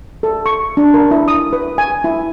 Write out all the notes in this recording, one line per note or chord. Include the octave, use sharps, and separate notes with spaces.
A4
C#6
D4
A#4
E4
D#6
B4
G#5
E4